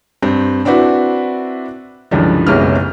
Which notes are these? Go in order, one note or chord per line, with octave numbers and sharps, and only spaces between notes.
G2 C4
C4 D4 E4 F#4 B4
C#2 G2 D3 E3 F3
F#1 B1 C3 G#3 B3 F6